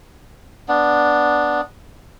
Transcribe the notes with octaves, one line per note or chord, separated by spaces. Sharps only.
B3 D4